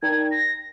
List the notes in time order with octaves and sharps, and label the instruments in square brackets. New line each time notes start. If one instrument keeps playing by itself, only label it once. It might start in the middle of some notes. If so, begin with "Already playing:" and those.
[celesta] D#4 A#4 D5 G5 A#5 [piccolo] G#6
[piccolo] A#6